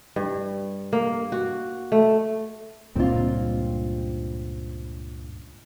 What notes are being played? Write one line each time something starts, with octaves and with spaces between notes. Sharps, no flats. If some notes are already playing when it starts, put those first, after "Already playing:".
G2
A#3
F#4
A3
C#2 G2 A#2 C4 F4